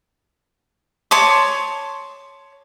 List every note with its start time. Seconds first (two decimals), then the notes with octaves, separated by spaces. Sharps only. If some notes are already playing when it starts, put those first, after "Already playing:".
1.11 C#5 A5 C6 D6